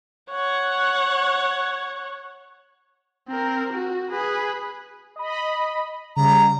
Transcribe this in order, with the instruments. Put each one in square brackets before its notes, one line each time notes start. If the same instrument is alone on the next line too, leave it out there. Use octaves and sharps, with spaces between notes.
[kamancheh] C#5 F#5
[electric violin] C4 A#4
F#4
G#4 B4
[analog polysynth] D#5 B5
[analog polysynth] C#3 G3 [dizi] A#5